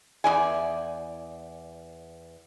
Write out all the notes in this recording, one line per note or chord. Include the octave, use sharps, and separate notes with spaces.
E2 G#2 D5 G#5